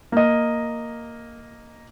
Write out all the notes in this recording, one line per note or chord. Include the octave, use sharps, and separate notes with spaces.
A#3 D#5